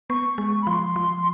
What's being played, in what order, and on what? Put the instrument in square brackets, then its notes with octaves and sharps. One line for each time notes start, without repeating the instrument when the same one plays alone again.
[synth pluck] B3 [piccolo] C#6
[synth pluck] G#3
[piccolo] B5
[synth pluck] F3 [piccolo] C6
[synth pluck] F3